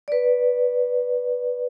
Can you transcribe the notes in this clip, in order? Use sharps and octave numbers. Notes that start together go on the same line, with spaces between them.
B4 D5